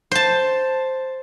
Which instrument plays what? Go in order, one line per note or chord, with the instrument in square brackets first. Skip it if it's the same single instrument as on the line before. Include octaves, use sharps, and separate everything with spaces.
[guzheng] C5 A5